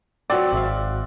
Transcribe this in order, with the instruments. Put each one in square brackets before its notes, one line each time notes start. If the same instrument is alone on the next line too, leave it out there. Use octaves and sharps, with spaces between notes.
[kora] F#3 C4 [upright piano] F#4 D5
[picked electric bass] G#1 [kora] E5 F5